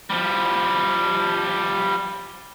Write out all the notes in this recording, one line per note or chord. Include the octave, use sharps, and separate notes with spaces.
F3 G3